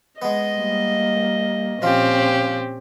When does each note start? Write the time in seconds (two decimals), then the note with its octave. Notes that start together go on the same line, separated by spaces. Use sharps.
0.22 G#3 B3 D#5
0.58 G3 A#3
1.82 A#2 F3 C4 C#4 F4 G4